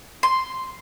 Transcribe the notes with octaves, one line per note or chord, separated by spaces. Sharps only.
C6